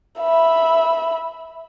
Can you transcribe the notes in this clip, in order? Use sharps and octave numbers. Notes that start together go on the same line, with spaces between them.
E5 B5